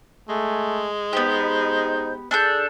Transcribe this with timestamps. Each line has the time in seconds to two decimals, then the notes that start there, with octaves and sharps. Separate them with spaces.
0.29 G#3 A3 G#5
1.13 B3 D#4 G4 C5
2.31 D4 G#4 A4 G6